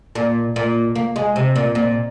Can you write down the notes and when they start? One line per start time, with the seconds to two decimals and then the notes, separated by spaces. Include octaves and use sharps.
0.15 A#2
0.56 A#2
0.95 A#3
1.16 G#3
1.36 C3
1.56 A#2
1.75 A#2